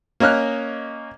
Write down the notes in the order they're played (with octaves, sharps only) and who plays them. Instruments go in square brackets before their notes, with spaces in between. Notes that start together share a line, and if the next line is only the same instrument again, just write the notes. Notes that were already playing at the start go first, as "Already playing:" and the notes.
[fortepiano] A#3 C#4 D#5 F6 F#6